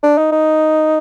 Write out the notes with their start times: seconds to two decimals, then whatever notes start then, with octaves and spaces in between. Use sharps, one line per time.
0.04 D4
0.18 D#4
0.32 D#4